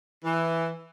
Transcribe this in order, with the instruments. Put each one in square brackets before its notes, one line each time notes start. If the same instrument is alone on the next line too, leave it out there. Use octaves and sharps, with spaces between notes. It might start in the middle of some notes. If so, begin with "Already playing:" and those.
[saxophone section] E3